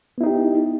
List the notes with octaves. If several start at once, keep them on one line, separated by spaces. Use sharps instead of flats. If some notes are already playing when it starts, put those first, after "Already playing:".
B3 D#4 E4 G4